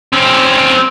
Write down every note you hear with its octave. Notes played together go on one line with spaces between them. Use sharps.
C4 C#4